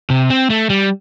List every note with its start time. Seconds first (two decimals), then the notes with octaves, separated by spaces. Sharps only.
0.10 C3
0.30 C4
0.50 A3
0.70 G3